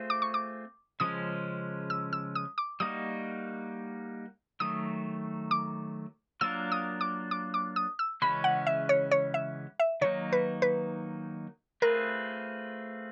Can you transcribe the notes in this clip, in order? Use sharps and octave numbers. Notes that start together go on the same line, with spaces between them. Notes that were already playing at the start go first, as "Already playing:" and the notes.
Already playing: A3 C4 F4 G#4 C5
D6
C#6
D6
C#3 F3 G#3 C#4 D#6
E6
E6
D#6
D6
G3 A#3 D#4 F#4 D#6
D#3 F#3 A3 D#6
D6
F#3 A#3 D4 F4 A#4 E6
D#6
D6
D6
D6
D#6
E6
C#3 E3 G#3 C#4 F#4 B5
F#5
E5
C#5
C#5
E5
E5
D#3 F#3 A#3 D#4 C#5
B4
B4
A3 C4 F4 G#4 A#4 B4